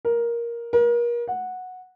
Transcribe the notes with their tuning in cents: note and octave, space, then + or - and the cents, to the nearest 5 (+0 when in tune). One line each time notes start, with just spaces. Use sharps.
A#4 +10
A#4 +35
F#5 -10